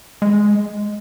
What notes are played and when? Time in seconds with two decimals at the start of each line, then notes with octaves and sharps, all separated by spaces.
0.22 G#3